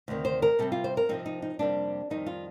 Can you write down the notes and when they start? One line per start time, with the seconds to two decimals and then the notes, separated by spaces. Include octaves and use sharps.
0.08 D2 C3 D#3
0.25 C5
0.42 A#4
0.59 C3 G3 C4 A4
0.72 F4
0.84 C5
0.97 A#4
1.09 C3 F3 C4 D#4
1.26 D#4
1.42 D#4
1.59 F2 C3 G3 A#3 D4
2.10 F2 D#3 G3 D#4
2.26 F4